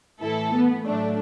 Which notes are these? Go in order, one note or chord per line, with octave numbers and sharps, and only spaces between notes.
A2 E3 E4 A4
B3
A2 F#3 A3 D4